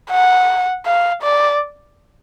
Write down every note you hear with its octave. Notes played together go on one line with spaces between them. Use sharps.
F#5
F5
D5